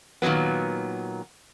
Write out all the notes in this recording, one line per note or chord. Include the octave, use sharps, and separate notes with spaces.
A#2 D#3 F3 F#3 B3